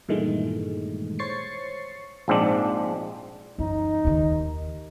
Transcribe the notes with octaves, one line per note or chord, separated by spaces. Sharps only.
G2 A#2 D#3 E3 G#3 A3
C5 C#5 C#6 A6 C7 C#7
A#1 G#2 C4 D4
F#2 E3 D#4
D#2 D#3